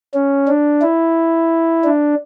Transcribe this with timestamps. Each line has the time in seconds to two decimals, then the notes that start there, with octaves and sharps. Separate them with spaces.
0.14 C#4
0.47 D4
0.82 E4
1.84 D4